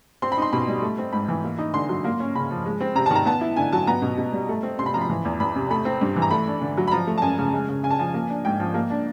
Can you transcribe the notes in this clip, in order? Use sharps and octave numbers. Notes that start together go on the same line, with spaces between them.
C4 C6
B5
D#4 C6
B2 B5
G3
A3
C4
G#2 B5
E3
A#3
D#4
D3 C6
F#3
A#3
C#4
C#3 B5
F3
G#3
C4
C3 A#5
A5
D#3 A#5
B3 A5
E4
D3 G#5
F#3 A5
B3 A#5
B2
B2
G3
A3
C4
C3 C6
B5
F3 A#5
B5
E3
E2
E2 B5
C3
A3 B5
C4
G2
E3
A#5
A3 B5
D4
D3
F#3
B5
F3 A#5
A3
A5
F#2 G#5
C#3
G#3
C#3
C#3 G#5
A5
F3 G#5
A#3
D4
G#2 G5
F3
A#3
D4